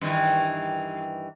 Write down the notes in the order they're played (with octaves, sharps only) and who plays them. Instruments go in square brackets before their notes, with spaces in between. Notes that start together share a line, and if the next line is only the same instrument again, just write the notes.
[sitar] G2 D#3 E3